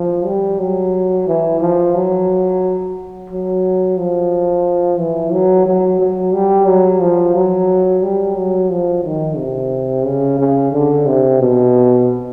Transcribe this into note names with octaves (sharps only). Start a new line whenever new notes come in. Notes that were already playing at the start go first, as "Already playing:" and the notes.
Already playing: F3
G3
F#3
E3
F3
F#3
F#3
F3
E3
F#3
F#3
F#3
G3
F#3
F3
F#3
G3
F#3
F3
D#3
C3
C#3
C#3
D3
C3
B2